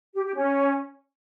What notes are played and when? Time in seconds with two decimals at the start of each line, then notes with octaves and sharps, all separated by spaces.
0.15 G4
0.25 G4
0.36 C#4